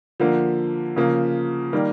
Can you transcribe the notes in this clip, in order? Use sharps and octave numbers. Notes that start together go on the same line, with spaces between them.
D3 F3 A#3
C#3 F3 A#3
D#3 G3 A#3